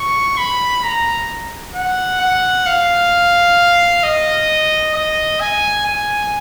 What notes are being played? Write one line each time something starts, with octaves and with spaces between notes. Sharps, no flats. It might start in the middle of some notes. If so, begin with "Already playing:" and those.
Already playing: C#6
B5
A#5
F#5
F#5
F5
D#5
D#5
G#5
G#5